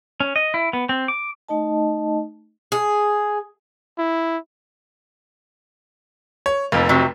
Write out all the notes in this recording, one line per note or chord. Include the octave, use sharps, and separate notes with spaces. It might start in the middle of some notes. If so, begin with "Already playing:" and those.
C#4
D#5
E4
B3
C4
D6
A3 D#4 D#5 A5
G#4
E4
C#5
F1 F2 A#3
C3 F#3